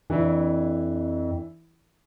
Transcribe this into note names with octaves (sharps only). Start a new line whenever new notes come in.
F2 E3 D4 E4